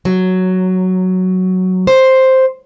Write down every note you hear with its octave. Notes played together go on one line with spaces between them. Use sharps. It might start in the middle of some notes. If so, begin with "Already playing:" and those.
F#3
C5